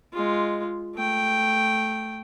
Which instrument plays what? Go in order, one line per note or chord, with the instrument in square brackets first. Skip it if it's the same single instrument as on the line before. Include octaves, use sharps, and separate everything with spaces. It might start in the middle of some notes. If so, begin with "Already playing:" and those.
[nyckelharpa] G#3 F4
A3 G5